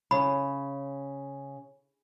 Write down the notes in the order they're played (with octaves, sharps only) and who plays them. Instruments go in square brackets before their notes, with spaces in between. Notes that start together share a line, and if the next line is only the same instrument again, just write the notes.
[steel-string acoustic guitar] C#3 [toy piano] B5